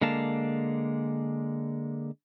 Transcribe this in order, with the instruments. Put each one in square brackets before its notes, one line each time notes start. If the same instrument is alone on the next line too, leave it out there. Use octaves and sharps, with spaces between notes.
[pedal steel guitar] D3 G#3 A#3 F5 A5